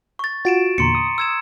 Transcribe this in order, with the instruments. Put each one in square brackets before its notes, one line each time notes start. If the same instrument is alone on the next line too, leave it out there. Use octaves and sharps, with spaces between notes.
[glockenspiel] C#6 A6
[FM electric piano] F4 F#4 [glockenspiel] A6 D7 E7
[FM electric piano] E2 A#2 D3 [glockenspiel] A#5 C6 C#7
[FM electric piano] D#6
[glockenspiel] E6 G#6 E7